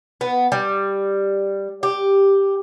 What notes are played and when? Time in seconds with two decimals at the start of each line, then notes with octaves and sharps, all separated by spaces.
0.21 B3
0.52 G3
1.83 G4